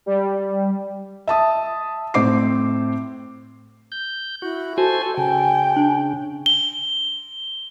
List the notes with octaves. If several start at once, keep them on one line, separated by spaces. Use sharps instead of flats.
G3
E5 A5 D#6
A2 C4 C5 D6 C7
G6
E4 F#4
F#4 A4 C5 G#5
C#3 G5 G#5
D4
G7